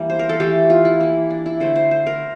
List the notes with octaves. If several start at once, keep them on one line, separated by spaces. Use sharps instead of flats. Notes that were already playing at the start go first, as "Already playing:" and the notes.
Already playing: E3 G3 A#3 G4
C5
A#4
A4
E3 A3 G4
F4
E4
E3 A#3 E4
D4
E4
D3 A3 C5
C5
C5
A#4